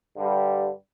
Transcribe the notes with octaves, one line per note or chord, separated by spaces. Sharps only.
G2 D3 G3